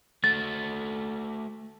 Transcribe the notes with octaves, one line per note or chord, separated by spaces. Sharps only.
A3 F#4 A6